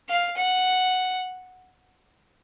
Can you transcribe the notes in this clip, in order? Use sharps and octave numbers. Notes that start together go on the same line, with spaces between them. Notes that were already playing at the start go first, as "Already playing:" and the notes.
F5
F#5